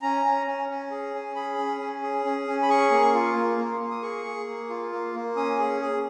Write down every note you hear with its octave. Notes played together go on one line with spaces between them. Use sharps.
C#4 A#5
C#4
C#4
C#4
G#4
C#4
G#4 B5
C#4
C#4
G#4
C#4
C#4
B5
G#4 C#6
A#3
F4
A#3
A#3
A#3
D#6
G#4 C#6
G#4
A#3
F4
A#3
A#3
C#4 D#6
G#4
G#4